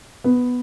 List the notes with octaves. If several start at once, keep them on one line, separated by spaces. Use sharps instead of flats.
B3